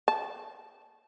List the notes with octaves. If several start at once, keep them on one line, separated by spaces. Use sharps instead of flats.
A5